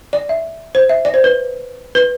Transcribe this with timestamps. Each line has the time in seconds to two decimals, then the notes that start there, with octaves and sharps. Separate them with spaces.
0.13 D5
0.29 E5
0.75 C5
0.89 E5
1.05 D5
1.14 C5
1.24 B4
1.95 B4